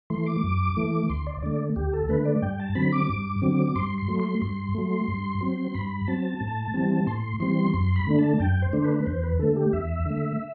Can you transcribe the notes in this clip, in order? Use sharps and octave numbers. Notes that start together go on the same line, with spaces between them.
E3 A3 C6
D6
F#2
E3 A3
D2 C6
D5
D3 A3 D5
D2 G4
A4
D3 A3 B4
D5
G2 G5
A5
D3 F#3 C4 B5
D6
G2
D3 F#3 C4
G2 C6
C6
F#3 A3
C6
G2 C6
F#3 A3
G2
F#3 C4
G2 B5
F#3 C4 A5
A2
E3 G3 C4
A2 C6
E3 G3 C4 C6
F#2 C6
B5
D3 A3 D4
A5
F#2 G5
C5
D3 A3 D4
B4
E2 C5
B4
D3 A3 A4
G4
E2 E5
D3 A3